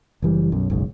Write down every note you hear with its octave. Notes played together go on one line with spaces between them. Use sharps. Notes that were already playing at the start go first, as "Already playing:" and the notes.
F#1 E3 G3
B1 F#2
F#1 B1 G#2